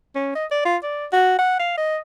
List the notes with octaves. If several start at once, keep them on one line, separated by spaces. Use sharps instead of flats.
C#4
D#5
D5
F4
D5
F#4
F#5
F5
D#5